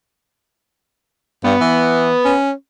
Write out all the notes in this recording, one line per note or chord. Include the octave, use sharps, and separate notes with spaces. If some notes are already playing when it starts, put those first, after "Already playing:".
G2 B3
E3
C#4